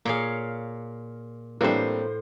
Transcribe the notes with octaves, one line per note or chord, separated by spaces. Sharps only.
A#2 A#3 G#4 C#5 F5
A2 E3 G3 A#3 C4 D4 C5